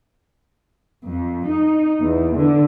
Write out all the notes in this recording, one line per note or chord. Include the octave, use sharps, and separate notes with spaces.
F2
D#4
E2
D3